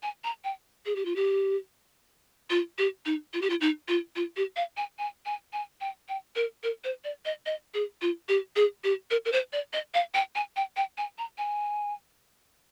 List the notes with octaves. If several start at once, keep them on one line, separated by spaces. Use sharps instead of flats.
G#5
A#5
G5
G#4
G4
F4
G4
F4
G4
D#4
F4
G4
F4
D#4
F4
F4
G4
F5
G#5
G#5
G#5
G#5
G5
G5
A#4
A#4
C5
D5
D#5
D#5
G#4
F4
G4
G#4
G4
A#4
A#4
C5
D5
D#5
F5
G5
G#5
G5
G5
G#5
A#5
G#5